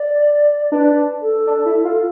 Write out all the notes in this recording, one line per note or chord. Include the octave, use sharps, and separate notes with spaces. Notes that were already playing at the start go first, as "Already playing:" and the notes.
Already playing: D5
D4 B4
A4
D4
E4
F4